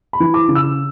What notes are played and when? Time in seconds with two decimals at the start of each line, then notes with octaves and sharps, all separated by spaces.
0.13 B5
0.20 E3
0.34 D6
0.48 C#3
0.55 E6